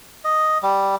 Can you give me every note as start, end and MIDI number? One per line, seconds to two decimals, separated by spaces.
0.24 0.58 75
0.63 0.96 55